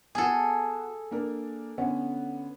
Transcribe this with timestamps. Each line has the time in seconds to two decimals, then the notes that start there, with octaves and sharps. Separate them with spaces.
0.15 B3 F#4 G#4 A4
1.11 A#3 D4 A#4
1.78 D3 B3 C#4